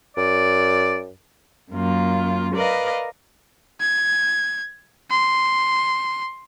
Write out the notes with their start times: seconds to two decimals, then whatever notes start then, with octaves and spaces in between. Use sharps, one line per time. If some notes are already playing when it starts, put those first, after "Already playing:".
0.17 F#2 D5
1.72 F#2 A#3 F4
2.55 A#4 B4 D5 D#5 F5
3.81 G#6
5.10 C6